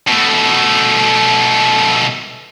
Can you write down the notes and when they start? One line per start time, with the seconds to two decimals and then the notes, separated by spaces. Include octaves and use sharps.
0.08 B2 A3